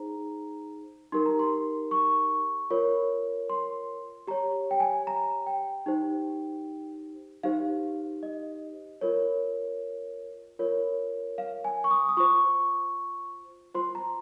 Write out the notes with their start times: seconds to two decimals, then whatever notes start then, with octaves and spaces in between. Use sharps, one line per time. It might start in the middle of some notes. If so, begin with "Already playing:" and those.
Already playing: D#4 G#4 C5 A#5
1.12 D#4 G4 A#4 C6
1.26 A#5
1.39 C6
1.91 C#6
2.70 F4 A#4 C#5
3.50 C6
4.27 G4 C#5 A#5
4.71 G5
4.80 G#5
5.07 A#5
5.46 G5
5.86 D#4 G4 C5
7.43 D#4 G4 C5 F5
8.23 D#5
9.01 F4 A#4 C#5
10.59 F4 A#4 C#5
11.38 F5
11.65 G#5
11.84 C#6
11.91 D#6
12.09 D#6
12.17 F4 C5 C#6
13.74 F4 C5 C6
13.95 A#5